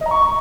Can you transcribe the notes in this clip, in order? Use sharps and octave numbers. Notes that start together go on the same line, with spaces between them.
D#5
A#5
C#6